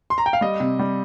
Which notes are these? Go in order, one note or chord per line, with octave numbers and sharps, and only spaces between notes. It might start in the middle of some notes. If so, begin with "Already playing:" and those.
C6
A#5
G5
F5
G3 D#5
C3
G3